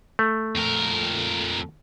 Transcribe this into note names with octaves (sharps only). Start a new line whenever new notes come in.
A3
F2 A#4